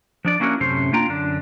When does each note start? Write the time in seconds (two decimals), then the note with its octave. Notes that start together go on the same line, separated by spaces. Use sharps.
0.25 F3 D4 D5
0.40 A#3 C#4 D4 E4 F#4 A#4
0.60 F#2 A2 C3 A3 C#4 C5
0.93 A#3 D4 F4 G5 A#5
1.09 F#2 D3 D4